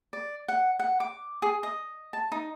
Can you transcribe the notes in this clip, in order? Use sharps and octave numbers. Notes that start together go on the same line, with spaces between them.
D5
F#5
F#5
D6
G#4
D#5
A5
D#4